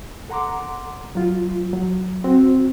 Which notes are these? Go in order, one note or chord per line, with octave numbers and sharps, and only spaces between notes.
A4 F#5 A#5 C6 D6
F#3 F4
F#3
C4 F#4